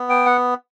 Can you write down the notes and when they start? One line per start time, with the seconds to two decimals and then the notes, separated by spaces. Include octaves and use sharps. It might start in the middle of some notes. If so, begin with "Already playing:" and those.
Already playing: B3
0.10 G5
0.26 F#5